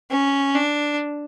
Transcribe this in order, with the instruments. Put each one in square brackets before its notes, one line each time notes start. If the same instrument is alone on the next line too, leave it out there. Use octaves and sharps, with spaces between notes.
[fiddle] C#4
D4